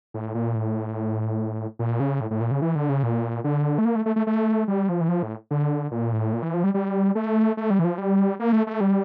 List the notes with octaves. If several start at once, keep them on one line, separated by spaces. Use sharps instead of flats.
A2
A#2
A2
A#2
C#3
A2
A2
A#2
C#3
E3
D3
C#3
A#2
D3
A3
A#3
A3
A3
A3
A3
G3
F3
E3
F3
A2
D3
A#2
A2
A#2
E3
F3
G3
G3
A3
A3
G3
E3
F3
G3
A#3
A3
A3
G3